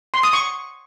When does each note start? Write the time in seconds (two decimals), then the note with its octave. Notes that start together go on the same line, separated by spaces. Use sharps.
0.14 C6
0.23 D#6
0.33 C#6